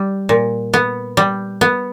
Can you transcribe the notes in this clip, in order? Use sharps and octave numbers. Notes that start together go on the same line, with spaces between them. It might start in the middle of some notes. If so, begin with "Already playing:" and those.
Already playing: G3
A#2
B3
G3
B3